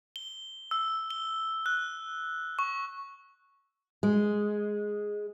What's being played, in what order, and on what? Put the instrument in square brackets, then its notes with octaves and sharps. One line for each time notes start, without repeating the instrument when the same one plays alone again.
[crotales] G7
E6
G7
F#6
C#6
[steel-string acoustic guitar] G#3